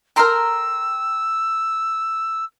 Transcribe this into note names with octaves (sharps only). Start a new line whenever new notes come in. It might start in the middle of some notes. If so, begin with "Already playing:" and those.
A4 A#4 G5 A#5 C6 E6